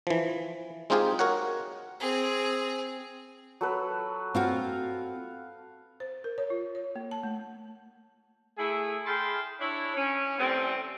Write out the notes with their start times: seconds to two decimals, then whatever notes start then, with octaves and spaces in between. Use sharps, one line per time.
0.07 E3 F3
0.90 G#3 C4 D#4 F4 G4 G#4
1.19 F#4 A#4 C#5 F#5
2.00 C4 G#4
3.61 F#3 A4 B4
4.35 C4 F4 F#4 F5
6.00 C5
6.24 A#4
6.38 C#5
6.50 F4
6.75 C#5
6.96 A#3
7.11 A5
7.23 A3
8.58 A3 E4 G#4
9.06 G#4 F5 G5 A5 B5 C6
9.60 D4 E4 C#5
9.96 C#4
10.39 E3 G3 A3 C4